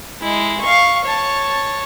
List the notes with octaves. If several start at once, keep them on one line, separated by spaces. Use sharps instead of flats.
G#3 E4
F5 C#6
C#5 A5